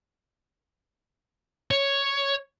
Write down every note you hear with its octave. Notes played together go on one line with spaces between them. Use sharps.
C#5